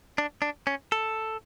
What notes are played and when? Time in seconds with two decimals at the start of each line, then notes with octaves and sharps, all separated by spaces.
0.18 D4
0.42 D4
0.67 C#4
0.92 A4